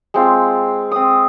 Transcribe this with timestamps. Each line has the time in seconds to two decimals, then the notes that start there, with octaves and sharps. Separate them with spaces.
0.14 G#3 C4 F4
0.91 C4 D#6